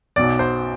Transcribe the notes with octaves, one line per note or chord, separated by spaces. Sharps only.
B1 B2 D5
C5